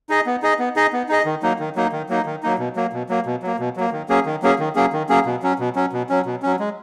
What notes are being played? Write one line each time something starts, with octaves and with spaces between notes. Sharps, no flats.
D#4 G#4 D#5
B3
D#4 G#4 D#5
B3
D#4 G#4 D#5
B3
D#4 G#4 D#5
D#3
F#3 A#3 D#4
D#3
F#3 A#3 D#4
D#3
F#3 A#3 D#4
D#3
F#3 A#3 D#4
B2
F#3 A#3
B2
F#3 A#3
B2
F#3 A#3
B2
F#3 A#3
D#3
F#3 A#3 C#4 G#4
D#3
F#3 A#3 C#4 G#4
D#3
F#3 A#3 C#4 G#4
D#3
F#3 A#3 C#4 G#4
B2
F#3 C#4
B2
F#3 C#4
B2
F#3 C#4
B2
F#3 C#4
G#3